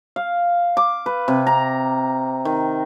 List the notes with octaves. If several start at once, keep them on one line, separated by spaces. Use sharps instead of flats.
F5
D6
B4
C3
A#5
D#3